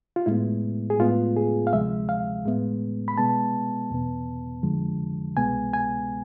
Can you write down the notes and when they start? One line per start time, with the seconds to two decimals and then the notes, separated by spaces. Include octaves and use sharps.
0.16 F4
0.26 A2 G#3 B3 E4
0.90 G#4
0.99 A2 G#3 B3 F4
1.37 G#4
1.67 F5
1.72 D2 C3 F3 G#3 E5
2.09 F5
2.45 A2 G#3 B3
3.08 B5
3.18 B2 G#3 B3 A5
3.90 E2 B2 B3
4.63 F2 D3 F3 G#3
5.37 C2 B2 G#3 B3 G#5
5.73 G#5